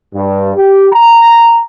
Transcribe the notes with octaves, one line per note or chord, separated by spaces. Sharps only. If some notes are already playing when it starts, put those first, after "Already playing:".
G2
G4
A#5